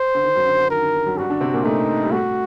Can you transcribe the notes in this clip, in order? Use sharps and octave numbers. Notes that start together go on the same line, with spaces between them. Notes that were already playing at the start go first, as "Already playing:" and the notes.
Already playing: C5
D3
D#3
F#2 F#3
D3
D3
D#3 A#4
D3
D#3
F#2 F#3
G2 G3 F#4
D3 D4
C3 C4
A#2 A#3
A2 A3 D#4
G3
A2 A3 F#4